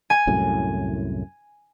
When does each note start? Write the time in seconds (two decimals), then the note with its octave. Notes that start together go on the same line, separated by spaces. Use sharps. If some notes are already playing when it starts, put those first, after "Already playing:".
0.10 G#5
0.27 C2 F#2 A2